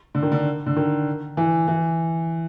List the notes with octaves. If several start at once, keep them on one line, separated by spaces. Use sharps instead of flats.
D3
D#3
D3
D3
D#3
E3
E3